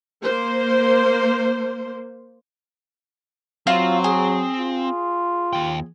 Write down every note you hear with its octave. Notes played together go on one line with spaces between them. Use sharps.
A#3 C5
F#3 C4 F4
G#4
F4
D#2 G5